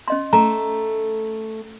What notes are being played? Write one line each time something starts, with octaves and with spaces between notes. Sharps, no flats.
C#4 D#5 C6
A3 A#5